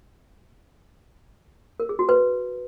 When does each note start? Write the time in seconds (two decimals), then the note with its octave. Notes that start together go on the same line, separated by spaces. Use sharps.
1.80 A#4
1.89 G#4
1.99 F#4
2.09 B4